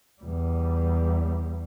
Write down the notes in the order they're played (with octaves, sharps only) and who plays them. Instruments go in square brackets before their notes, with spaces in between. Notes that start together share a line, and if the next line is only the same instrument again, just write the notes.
[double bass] E2 G3